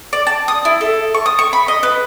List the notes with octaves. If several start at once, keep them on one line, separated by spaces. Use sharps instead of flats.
D5
A5
D#6
E4
A4
C#6
D#6
C#6
B5
D#5
B4